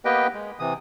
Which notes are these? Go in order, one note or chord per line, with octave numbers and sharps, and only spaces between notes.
A#3 B3 G4 B4 D#5 G5
G#3
C3 E3 D#6